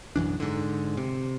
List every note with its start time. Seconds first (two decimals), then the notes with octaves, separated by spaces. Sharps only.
0.16 B1 F#2 E3 D4
0.40 G#2 D3
0.97 C3